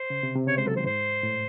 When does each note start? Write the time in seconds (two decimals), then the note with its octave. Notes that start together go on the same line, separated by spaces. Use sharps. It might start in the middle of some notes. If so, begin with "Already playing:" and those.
Already playing: C5
0.10 C#3
0.23 C3
0.35 C3
0.47 C#3 C#5
0.57 G#3 C5
0.66 F#3 A4
0.75 D#3 C5
0.86 G#2 C5
1.23 A2